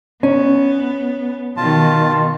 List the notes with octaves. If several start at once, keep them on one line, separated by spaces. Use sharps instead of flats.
B3 C#4
B2 D#3 F4 A5